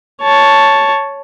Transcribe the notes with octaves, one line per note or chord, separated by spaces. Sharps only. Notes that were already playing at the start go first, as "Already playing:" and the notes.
C#5 A5